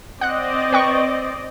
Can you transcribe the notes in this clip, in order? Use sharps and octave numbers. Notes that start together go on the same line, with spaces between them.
C4 D5 D#5 F#5 F#6
B4 G5 C#6